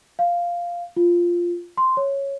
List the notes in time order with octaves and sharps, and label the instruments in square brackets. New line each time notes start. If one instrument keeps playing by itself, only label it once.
[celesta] F5
F4
C6
C#5